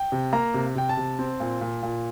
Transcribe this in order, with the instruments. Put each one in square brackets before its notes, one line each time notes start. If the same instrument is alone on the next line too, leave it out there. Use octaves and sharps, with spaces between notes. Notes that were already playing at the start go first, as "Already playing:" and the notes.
Already playing: [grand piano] G5
C3
A#3 A#5
C3
C3 G5
A5
C3
C4
A#2
A#2
A#2